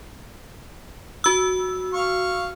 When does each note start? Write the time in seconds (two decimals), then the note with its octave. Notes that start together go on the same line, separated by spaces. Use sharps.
1.24 F#4 E6
1.94 F5 C#6